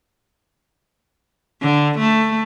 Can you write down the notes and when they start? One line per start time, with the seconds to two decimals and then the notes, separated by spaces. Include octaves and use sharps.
1.61 D3
1.99 A3